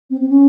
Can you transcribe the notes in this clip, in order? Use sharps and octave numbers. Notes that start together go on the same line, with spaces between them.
C4
C4
C#4